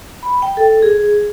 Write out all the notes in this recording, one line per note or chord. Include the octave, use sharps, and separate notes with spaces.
B5
G5
A4
G#4